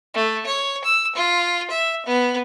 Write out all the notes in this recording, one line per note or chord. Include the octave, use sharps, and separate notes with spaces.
A3
C#5
E6
F4
E5
B3